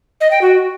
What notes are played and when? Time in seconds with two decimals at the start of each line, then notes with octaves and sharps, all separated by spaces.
0.21 D#5
0.31 G5
0.41 F#4